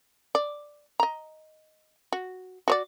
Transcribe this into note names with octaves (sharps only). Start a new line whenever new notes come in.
D5
D#5 A#5
F#4
F#4 C#5 D5